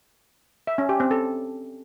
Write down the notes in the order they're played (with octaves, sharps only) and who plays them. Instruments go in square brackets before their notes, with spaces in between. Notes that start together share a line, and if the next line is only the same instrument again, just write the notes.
[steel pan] E5
C#4
G4
C4
A4